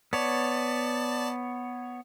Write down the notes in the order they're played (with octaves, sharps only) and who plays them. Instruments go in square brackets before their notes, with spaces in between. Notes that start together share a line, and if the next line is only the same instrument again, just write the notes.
[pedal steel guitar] B3 C#5 [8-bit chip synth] D5 A5